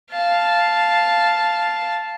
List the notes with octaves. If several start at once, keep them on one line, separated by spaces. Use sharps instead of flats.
F5 A5